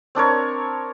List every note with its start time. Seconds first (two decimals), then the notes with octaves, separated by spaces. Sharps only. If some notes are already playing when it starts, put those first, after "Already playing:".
0.15 C4 D4 A#4 C#5